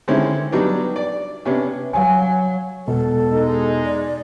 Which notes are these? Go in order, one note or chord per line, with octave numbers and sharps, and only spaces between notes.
D3 D#3 G#3 C4 C#4 E4
F#3 G3 B3 D4 D#4
D5
C3 B3 C#4 D4
F#3 F5 G#5
E1 B2 A4
G#3 D#4
D5